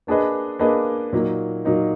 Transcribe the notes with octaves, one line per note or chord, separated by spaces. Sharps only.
A#3 D4 G#4 B4 D#5
A#3 D4 G#4 B4 D#5
A#2 F#3 A#3 D#4
A#2 F#3 A#3 D#4